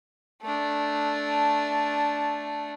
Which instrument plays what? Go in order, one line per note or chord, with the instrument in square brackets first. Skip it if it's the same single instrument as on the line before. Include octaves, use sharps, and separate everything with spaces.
[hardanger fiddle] A3 D4